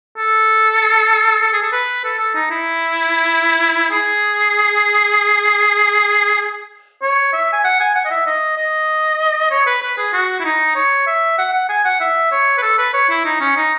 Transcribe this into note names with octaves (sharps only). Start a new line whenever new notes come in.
A4
A4
G#4
A4
B4
A4
A4
D#4
E4
G#4
C#5
E5
G#5
F#5
G#5
F#5
D#5
E5
D#5
D#5
C#5
B4
B4
G#4
F#4
E4
D#4
C#5
E5
F#5
F#5
G#5
F#5
E5
C#5
B4
A4
B4
C#5
E4
D#4
C#4
D#4